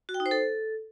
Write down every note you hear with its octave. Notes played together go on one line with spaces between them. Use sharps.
F#4
G5
D#4
C5
A4